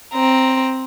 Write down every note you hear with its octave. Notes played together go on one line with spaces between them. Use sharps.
C4 A#5